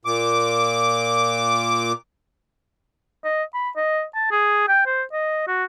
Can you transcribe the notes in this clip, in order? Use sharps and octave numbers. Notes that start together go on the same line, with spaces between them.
A#2 D6
D#5
B5
D#5
A5
G#4
G5
C5
D#5
F#4